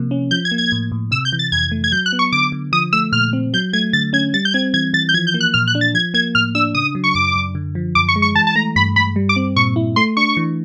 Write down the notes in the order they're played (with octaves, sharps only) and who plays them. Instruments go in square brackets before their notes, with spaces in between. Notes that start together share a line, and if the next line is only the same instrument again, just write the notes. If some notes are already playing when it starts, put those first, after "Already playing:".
Already playing: [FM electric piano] C3 F3 A#3
C#4
[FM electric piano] F3 [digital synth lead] G6
[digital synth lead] G#6
[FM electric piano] A#3
[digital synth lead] G#6
[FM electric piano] A2
A2
[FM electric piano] C3 [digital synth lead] E6
[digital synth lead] G6
[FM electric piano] E3
[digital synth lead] A6
[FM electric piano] F2 [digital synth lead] G#6
[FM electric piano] A3
[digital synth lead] G#6
[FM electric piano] F#3 [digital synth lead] G6
[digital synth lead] F#6
[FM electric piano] B3
[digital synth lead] C#6
[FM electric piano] D3 [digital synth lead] D6
[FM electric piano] D3
[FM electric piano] F3 [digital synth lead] D#6
[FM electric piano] A3 [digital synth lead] E6
[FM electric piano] A#2 [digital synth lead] F6
[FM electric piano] C4
[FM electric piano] F#3 [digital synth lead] G6
[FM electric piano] A3 [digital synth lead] G#6
[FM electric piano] D3 [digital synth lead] A6
[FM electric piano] C#4 [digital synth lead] G#6
[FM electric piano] G3 [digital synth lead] A6
[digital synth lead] G6
[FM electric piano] C4 [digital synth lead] G#6
[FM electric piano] E3 [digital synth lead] G#6
[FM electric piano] E3 [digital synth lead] A6
[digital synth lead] G6
[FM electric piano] F3 [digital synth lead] G#6
[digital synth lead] G6
[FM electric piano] A#3
[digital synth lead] F#6
[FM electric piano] A#2 [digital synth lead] F6
[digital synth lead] F#6
[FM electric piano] D4
[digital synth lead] A6
[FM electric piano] F3 [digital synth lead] G#6
[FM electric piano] A#3 [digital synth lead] G#6
[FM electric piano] A2 [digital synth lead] F6
[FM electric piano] D4 [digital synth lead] E6
[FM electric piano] C#3 [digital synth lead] D#6
[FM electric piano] F#3
[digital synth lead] C#6
[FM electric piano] F#2 [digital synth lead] D6
[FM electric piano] F#2
D3
F3
[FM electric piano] F#2 [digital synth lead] D6
[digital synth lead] C#6
[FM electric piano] G#3
[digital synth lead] C#6
[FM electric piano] E3 [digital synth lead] A5
[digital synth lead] A5
[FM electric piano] A3 [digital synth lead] A#5
[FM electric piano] G2 [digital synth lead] B5
[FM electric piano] G2 [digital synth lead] B5
[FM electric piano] G3
[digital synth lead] D6
[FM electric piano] C4
[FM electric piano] A#2 [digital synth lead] C#6
[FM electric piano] E4
[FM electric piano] A3 [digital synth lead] C6
[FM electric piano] D4 [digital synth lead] C#6
[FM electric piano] E3